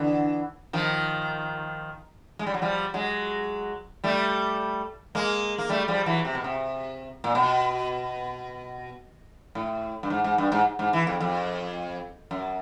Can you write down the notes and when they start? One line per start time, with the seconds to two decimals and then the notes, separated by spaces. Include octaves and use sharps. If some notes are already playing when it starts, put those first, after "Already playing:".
Already playing: D3 E3
0.73 D#3 F3
2.39 G#3
2.46 G3
2.54 F#3
2.62 F3 G3
2.94 F#3 G#3
4.04 G3 A3
5.15 G#3 A#3
5.58 A#3
5.69 G3 A3
5.88 F3 G3
6.06 E3 F#3
6.25 C3
6.35 B2
6.44 C3
7.24 A#2
7.35 B2
9.55 A2
10.03 G2
10.10 G#2
10.24 G#2
10.38 G2
10.52 G#2
10.79 G#2
10.93 E3
11.07 F2
11.20 F2
12.31 F#2